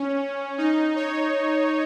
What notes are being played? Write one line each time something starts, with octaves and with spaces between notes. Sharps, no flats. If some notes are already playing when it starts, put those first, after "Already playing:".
Already playing: C#4
D#4
C#5